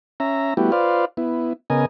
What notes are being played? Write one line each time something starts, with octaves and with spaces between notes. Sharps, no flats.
C#4 E5 A#5
G3 A3 B3 E4 F#4 G4
F4 B4 C5 D5 F5
B3 E4
C#3 B3 A#4 D#5 G#5